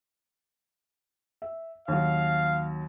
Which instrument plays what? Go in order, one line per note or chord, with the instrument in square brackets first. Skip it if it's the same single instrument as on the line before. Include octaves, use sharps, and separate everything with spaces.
[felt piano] E5
[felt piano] D#2 F#3 [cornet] F5